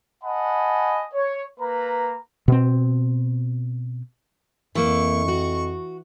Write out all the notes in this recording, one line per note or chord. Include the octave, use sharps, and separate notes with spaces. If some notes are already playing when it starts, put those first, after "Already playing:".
D#5 F#5 G#5 A5 B5
C#5
A#3 B4 A#5
B2 C4
F2 E3 A#3 C#6
F#4